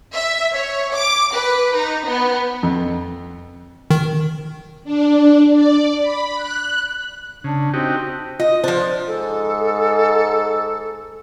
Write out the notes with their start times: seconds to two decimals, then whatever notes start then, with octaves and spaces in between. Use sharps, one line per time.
0.13 E5
0.54 C#5
0.95 D6
1.34 B4
1.75 D#4
2.06 B3
2.63 F2
3.91 D#3
4.84 D4
5.52 D5
6.01 B5
6.35 F#6
7.44 C#3 D4
7.74 C4 D#4 F#4 G4
8.40 F4 D#5
8.64 F3 D4 C5
9.07 G#2 A4